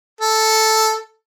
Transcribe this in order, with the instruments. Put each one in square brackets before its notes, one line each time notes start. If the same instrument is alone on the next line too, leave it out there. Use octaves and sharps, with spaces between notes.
[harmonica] A4